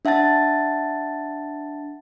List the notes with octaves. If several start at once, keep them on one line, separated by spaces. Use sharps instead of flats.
D4 E5 F#5 A5 A6